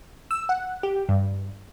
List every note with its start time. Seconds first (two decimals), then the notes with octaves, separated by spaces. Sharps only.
0.31 E6
0.49 F#5
0.83 G4
1.09 G2